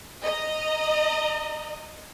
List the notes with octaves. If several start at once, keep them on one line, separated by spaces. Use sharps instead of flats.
D#5 A#5